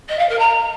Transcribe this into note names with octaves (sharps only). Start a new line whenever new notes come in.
D#5
F5
A#4
A#5